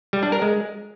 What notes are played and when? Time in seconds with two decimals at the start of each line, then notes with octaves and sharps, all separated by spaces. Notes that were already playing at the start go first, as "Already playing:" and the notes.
0.13 G3
0.23 D4
0.32 A#4
0.42 G#3